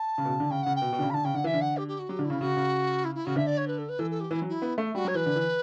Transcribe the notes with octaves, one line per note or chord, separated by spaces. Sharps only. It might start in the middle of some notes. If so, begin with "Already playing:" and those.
Already playing: A5
C#3
B2
C#3
D3
C#3 G5
C#3 F#5
G5
B2
B2
D3
C#3
B5
D3 A5
C#3 G5
D3 F#5
E3 E5
D3
F#5
G4
G4
F#4
F#3 G4
D3
E4
C#3
C#3 F#4
C#3
E4
E4
C#3 F#4
D3 E5
D5
C#5
B4
A4
B4
E3 A4
A4
G4
E3 E4
F#3
E4
B3
A3
G3 F#4
F#3 C#5
E3 B4
D3
E3